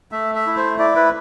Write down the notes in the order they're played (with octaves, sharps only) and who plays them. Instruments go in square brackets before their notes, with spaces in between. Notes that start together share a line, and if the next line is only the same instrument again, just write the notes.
[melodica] A3 E5
E5
E4
C5
E4 D5
B4